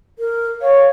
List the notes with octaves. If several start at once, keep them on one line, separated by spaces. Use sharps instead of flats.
A#4
C#5 F5